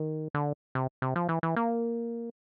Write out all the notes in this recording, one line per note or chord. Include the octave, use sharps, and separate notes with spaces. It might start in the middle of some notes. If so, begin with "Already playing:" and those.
Already playing: D#3
D3
C3
C3
F3
E3
E3
A#3